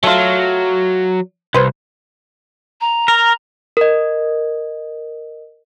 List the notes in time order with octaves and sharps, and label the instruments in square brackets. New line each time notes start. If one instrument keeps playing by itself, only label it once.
[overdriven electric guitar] F#3 [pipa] A3 F4
[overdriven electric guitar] C2 [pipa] B4 C5
[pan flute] A#5
[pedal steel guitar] A#4
[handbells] A#4 D#5